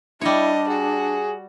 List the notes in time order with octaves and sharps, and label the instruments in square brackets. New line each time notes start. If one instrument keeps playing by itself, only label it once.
[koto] G3 C#5 [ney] D4 [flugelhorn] E4 [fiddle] D#5
[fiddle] F#4 [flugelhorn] G#4